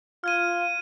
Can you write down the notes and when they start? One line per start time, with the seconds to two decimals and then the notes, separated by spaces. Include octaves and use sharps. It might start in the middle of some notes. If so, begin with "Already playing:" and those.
0.24 F4 F6 G#6 D#7